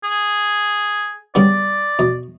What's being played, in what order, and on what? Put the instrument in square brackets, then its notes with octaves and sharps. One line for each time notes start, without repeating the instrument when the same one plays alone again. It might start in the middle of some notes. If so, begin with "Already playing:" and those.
[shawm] G#4
[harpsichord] C#3 G3 B3 [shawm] D5
[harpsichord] B2